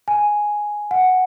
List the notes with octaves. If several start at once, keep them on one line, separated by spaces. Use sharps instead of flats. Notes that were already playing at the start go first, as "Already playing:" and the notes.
G#5
F#5